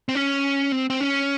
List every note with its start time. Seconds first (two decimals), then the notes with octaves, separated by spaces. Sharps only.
0.09 C4
0.15 C#4
0.72 C4
0.90 C4
1.00 C#4